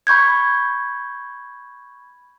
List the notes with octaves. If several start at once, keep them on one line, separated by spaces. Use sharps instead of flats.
B5 C#6 G6 G#6